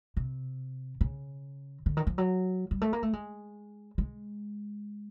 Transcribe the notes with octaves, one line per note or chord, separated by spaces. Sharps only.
C3
C#3
D3
D#3
F3
F#3
G3
A3
A#3
A3
G#3
G#3